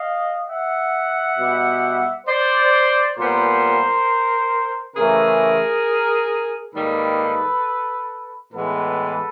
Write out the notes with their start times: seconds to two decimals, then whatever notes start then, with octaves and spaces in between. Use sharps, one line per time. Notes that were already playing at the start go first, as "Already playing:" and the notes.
Already playing: D#5 F5
0.48 E5 F#5
1.38 B2 G3 B3
2.27 C5 D5
3.16 A#2 G3 B3 A#4 C5
4.95 C#3 E3 A3 G#4 A#4
6.74 G#2 D#3 G3 A#3 A4 B4
8.52 A2 E3 G#3 B3 A4 B4